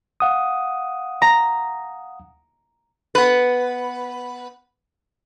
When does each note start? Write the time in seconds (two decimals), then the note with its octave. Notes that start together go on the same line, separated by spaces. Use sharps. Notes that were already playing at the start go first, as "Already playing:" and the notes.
0.20 F5 F#5 D#6
1.22 A#5
3.15 B3 B4